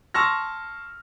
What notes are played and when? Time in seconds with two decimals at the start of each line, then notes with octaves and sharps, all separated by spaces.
0.14 A5 C6 C#6 E6 F6 A#6